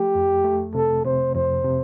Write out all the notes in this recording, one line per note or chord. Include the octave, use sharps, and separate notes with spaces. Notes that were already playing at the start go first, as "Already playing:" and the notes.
Already playing: F3 A3 G4
F2
A3
C3 A4
C3 C5
F2 C5
C3